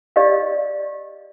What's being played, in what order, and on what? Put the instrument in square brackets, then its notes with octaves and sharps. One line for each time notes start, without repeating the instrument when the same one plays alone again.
[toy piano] G4 D5 D#5 F5